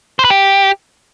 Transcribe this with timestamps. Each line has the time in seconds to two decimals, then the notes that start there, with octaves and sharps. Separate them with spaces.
0.19 C5
0.25 B4
0.30 G4